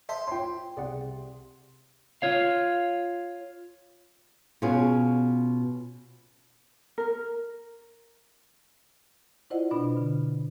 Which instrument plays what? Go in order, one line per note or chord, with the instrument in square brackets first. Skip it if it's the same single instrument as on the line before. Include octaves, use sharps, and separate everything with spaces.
[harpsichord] C5 [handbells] D#5 E5 A5
[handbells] F4 C#5 [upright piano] G5 C6
[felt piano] C2 [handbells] G#4 D5 F#5
[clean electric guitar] F4 C#5 F5
[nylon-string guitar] B2 C#4 F4 G#4
[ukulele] A#4
[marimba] E4 F4 C5 D5 D#5 F#5
B2 D4 B5
D3